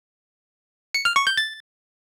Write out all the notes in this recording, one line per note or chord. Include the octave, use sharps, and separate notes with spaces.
C#7
F6
C#6
G6
A6